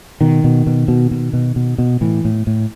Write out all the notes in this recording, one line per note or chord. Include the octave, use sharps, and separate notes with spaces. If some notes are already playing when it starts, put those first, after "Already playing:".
B2 D#3
B2
B2
B2
B2
B2
B2
B2
A2 E3
A2
A2